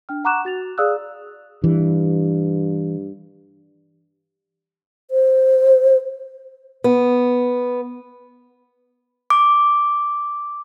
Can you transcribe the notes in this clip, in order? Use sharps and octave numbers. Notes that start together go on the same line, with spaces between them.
D4 G5 F6
F#5 A#5 C#6 D6 F#6 E7
F#4 A6 F7
G#4 D5 F5 D#6 E6 F#6
G2 E3
C5
B3
D6